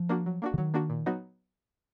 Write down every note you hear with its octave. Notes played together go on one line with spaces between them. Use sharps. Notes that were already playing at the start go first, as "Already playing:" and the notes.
Already playing: F3
A#3 D4 F#4
F#3
A#3 D4 F#4
D3
D#3 F#3
A#3 D4 F#4
A#2
F#3 B3 D#4 F#4